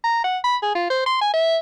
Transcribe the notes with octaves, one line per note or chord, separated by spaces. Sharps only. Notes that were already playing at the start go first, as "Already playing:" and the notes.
A#5
F#5
B5
G#4
F4
C5
C6
G#5
E5